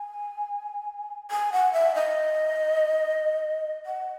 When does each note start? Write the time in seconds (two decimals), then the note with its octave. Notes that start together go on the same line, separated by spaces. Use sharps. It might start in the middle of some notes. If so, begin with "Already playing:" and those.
Already playing: G#5
1.31 G#5
1.52 F#5
1.73 E5
1.95 D#5
3.86 F#5